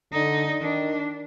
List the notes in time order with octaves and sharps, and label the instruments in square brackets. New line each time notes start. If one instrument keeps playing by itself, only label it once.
[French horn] D3 [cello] D#4
[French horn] D#3 [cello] D4